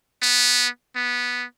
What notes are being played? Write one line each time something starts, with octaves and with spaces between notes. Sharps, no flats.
B3
B3